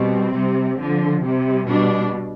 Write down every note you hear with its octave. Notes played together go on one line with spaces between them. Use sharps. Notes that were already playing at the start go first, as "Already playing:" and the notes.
Already playing: B2 G3 C4
C3 G3
D3 F3
C3 G3
B2 G3 D4